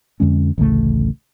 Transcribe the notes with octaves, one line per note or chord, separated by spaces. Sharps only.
F2 D3 G#3 C#4
A1 D2 C#3 A3